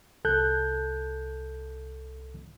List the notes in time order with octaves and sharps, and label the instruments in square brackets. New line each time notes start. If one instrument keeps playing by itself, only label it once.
[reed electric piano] C2 A4 A5 F#6 G6